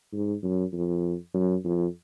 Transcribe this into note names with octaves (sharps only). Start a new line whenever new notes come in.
G#2
F#2
F2
F#2
F2